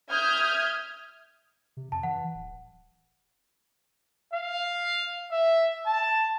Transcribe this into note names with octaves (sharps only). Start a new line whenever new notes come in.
E5 D#6 F6 G6 G#6
C3
F2 A5
E3 F#5
D1
F5
E5
A5